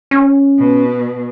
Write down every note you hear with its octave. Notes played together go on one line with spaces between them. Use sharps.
C#4
B2